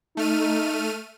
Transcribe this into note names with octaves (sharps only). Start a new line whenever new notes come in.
A3 D#4 F6 D#7